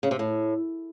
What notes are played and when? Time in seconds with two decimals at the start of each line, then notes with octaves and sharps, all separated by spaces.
0.03 C#3
0.11 C3
0.19 A2